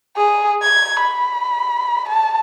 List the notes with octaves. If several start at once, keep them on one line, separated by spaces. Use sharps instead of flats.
G#4
G#6
B5
A5